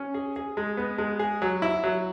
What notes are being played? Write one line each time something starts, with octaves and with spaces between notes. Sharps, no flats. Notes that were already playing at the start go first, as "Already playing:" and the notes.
Already playing: C#4
G#4
G#4
G#3
B3
G#3
G#4
F#3
E4
F#3